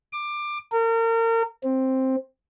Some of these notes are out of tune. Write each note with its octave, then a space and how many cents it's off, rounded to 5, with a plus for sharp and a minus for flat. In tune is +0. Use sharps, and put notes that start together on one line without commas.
D6 +20
A#4 -35
C4 +5